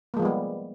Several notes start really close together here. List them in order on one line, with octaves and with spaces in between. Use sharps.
A#3 G#3 F3 B3 G3